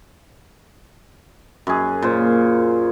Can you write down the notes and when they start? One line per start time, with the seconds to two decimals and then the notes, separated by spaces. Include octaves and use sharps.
1.67 F#2 G#4
2.02 A#2 C5